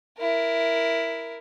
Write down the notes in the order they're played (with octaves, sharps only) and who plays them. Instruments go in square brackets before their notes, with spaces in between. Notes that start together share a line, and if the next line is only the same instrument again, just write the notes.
[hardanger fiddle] E4 A#4